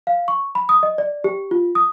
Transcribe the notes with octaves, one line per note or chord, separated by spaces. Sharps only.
F5
C#6
B5
D#6
D#5
D5
G4
F4
D#6